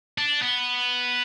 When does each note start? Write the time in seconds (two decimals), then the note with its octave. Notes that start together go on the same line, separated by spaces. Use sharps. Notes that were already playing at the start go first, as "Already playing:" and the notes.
0.18 D4
0.43 B3